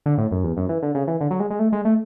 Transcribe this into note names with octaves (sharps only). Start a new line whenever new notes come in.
D3
A2
F#2
E2
F#2
E3
D3
C#3
E3
D3
F#3
G#3
G#3
A3
G#3
A3